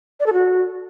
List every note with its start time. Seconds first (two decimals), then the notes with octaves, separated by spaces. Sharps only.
0.20 D5
0.26 A4
0.33 F#4